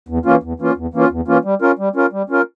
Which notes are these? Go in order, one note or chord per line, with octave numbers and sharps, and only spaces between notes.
E2
E3 A#3 C#4 F4
E2
E3 A#3 C#4 F4
E2
E3 A#3 C#4 F4
E2
E3 A#3 C#4 F4
G3
C#4 F4 A#4
G3
C#4 F4 A#4
G3
C#4 F4 A#4